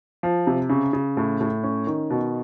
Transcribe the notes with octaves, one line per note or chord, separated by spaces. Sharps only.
F3
C3
C#3
C#3
A2
A2
C#4
D#3
B2